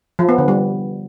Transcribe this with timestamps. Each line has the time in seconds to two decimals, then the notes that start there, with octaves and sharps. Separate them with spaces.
0.19 F3
0.29 B3
0.38 D3
0.48 G3